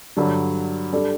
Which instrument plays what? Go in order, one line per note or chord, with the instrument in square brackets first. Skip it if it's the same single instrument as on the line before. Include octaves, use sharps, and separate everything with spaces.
[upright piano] G2 D3 F#3
G3 D4 A4